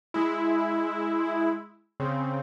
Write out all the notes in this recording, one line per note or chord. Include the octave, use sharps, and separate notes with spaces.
G#3 E4
C#3 C4